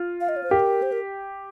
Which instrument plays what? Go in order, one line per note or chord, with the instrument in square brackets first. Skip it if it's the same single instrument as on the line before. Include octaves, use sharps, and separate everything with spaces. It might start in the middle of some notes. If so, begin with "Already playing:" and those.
Already playing: [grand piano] F4
[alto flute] F5
D#5
C#5
C5
[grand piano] G4 [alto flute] A#4
[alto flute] C5
A#4